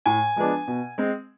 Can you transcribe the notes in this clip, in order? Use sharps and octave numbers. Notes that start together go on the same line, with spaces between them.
A2 G#5
F3 G#3 B3 D4
B2
G#3 C4